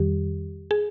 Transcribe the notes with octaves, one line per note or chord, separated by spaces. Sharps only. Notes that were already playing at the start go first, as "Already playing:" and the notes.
Already playing: F2 D#3 G3 G4
G#4